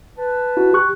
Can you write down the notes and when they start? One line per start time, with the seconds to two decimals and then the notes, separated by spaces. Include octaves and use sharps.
0.18 B4 A5
0.57 E4 F#4
0.73 G4 C#6 F#6